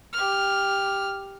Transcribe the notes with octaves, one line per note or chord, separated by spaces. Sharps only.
G4 F6